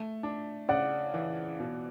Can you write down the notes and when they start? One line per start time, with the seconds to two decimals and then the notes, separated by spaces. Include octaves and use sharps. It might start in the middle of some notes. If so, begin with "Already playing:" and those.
Already playing: A3
0.23 D4
0.69 C#3 D5 F#5
1.14 E3
1.60 B2